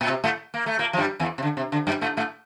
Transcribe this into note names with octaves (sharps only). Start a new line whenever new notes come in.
A#2
C3
A2 A3
A#3
A3
A#2 A#3
F3
G2 G3
E2 E3
C3
D3
C3
D3
G2 G3
A2 A3
A2 A3